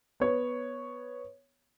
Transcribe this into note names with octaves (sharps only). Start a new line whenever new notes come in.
B3 C#5